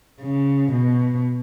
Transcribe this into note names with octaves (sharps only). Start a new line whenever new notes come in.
C#3
B2